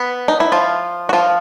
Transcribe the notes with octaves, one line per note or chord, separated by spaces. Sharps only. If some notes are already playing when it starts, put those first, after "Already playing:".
Already playing: B3 B4
D#4
E4
F3 F4
F#4
F3 F4